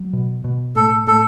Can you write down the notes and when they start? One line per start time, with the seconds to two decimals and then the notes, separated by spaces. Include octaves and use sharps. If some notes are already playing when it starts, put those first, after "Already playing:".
Already playing: F#3
0.13 B2
0.44 B2
0.75 A2 A4
1.07 A2 A4